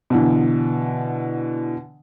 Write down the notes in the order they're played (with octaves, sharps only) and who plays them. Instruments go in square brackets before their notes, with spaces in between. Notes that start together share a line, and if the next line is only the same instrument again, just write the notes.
[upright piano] B2 D3 E3